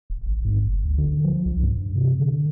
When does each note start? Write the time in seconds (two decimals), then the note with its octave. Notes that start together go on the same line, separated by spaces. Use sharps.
0.10 D1
0.26 G#1
0.45 G#2
0.65 G1
0.84 D2
0.98 D3
1.24 F3
1.46 C2
1.63 G2
1.77 G2
1.96 C3
2.19 D3